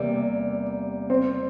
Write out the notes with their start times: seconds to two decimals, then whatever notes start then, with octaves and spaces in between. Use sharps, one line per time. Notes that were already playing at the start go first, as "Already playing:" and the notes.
Already playing: E2 C3 G3 A#3
1.10 C4